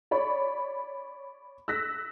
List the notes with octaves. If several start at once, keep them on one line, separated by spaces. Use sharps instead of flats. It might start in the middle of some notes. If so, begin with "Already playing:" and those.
C#5 D5 B5 C#6
E6 F#6 A#6 B6